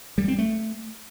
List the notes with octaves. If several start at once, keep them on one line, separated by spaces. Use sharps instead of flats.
G3
C4
A3